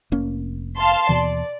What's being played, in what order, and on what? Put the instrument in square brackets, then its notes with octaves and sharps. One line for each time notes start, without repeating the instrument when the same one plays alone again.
[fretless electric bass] F1 A#3 C#4
[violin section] F5 A5 C6
[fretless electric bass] D#2 B2 E3 [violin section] D5